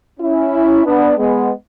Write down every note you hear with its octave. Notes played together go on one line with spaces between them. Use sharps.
C#4 E4
B3 D4
G#3 B3